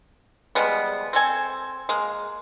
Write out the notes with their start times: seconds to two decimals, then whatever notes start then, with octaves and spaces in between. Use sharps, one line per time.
0.55 F3 G3 G#3 B3
1.13 C4 A4 G#5
1.89 G#3 A#3